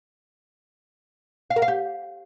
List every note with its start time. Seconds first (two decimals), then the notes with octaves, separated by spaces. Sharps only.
1.50 F5
1.56 A#4
1.62 F5
1.68 G4